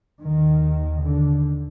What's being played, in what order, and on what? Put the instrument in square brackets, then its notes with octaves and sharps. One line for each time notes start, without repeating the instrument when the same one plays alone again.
[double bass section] D#2 D#3
D3